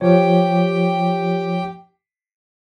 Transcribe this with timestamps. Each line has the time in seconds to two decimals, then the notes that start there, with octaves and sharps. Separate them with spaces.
0.01 F3 G4 C#5 G5